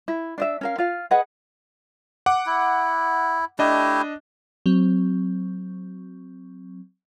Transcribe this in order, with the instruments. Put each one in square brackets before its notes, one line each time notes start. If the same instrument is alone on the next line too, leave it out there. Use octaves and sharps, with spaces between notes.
[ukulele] E4
D4 D#5 E5
C#4 A#4 F5
F4 F5
G#4 B4 D#5 F#5
[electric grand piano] F#5 D6
[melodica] E4
[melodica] A3 E4 G4 [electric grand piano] D4 D#5
[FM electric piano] F#3 C4